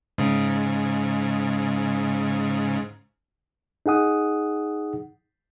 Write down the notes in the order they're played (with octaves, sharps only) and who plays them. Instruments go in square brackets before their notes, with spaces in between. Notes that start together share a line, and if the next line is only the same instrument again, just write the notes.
[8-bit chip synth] G#2 C#3
[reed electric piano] D#4 G#4 F#5 D#6